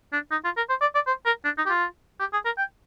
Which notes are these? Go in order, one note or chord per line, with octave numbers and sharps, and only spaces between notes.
D4
D#4
F4
A#4
C5
D5
D5
C5
A#4
D4
D#4
G4
F4
G4
G#4
A#4
G5